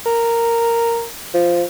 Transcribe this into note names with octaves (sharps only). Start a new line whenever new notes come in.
A#4
F3